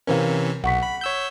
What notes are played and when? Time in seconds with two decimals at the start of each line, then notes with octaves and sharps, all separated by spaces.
0.07 C3 E3 C#4 A#4 C5 F5
0.64 B1 F#5 C#6 B6
0.83 B5
1.01 C#5 E6 G6